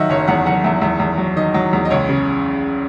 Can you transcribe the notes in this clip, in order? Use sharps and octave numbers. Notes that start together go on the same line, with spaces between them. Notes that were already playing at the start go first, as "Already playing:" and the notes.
Already playing: D#3 F#3 D#5 E5 F#5
F#1 C#5
E2 F#5
F#1 F#5
E2 E5
E2 E5
E2
F#3
D#3 D#5
F#3
E2
D#5
C#2 C#5
C#3